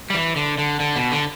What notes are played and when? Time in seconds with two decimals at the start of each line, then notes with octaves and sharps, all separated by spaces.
0.10 G3
0.14 E3
0.36 D3
0.58 D3
0.80 D3
0.96 B2
1.12 D3